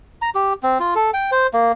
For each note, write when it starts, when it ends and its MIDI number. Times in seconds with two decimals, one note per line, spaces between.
0.22 0.30 82
0.35 0.53 67
0.63 0.78 60
0.80 0.94 65
0.95 1.11 69
1.14 1.31 79
1.32 1.47 72
1.53 1.72 58